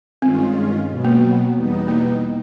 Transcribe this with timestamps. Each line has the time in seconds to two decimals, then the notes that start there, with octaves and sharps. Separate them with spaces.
0.22 G2 D#3 G#3 C4 C#4 F4
0.89 B2 F#3 B3
1.05 A#3
1.55 E2 B2 G3 B3 D#4
1.88 A#3